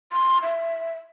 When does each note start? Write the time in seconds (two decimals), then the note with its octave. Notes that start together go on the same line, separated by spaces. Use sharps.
0.13 C6
0.43 E5